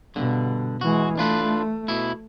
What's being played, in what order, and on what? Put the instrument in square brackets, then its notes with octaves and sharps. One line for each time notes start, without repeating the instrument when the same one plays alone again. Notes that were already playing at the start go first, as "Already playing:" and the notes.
[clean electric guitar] G2 D3 [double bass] B2
[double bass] E3 G#3 [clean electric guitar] F#4
[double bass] A3 [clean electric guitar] D4 F4 B4
[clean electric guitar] B2 E4